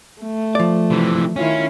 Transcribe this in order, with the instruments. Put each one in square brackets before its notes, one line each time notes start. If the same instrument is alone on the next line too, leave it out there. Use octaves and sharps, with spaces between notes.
[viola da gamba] A3
[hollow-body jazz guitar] F3 D5
[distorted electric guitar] C3 E3
[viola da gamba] D#3 E4 F4 [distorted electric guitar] C#4